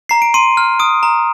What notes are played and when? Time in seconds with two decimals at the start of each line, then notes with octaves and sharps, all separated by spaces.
0.09 A#5 C7
0.22 D7
0.34 C6 D#7
0.57 F6
0.79 D#6 D7
1.03 A#5